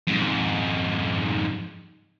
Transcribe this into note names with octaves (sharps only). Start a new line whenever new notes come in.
F2 G#2